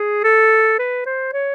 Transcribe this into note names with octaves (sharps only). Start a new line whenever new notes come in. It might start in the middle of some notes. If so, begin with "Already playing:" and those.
Already playing: G#4
A4
B4
C5
C#5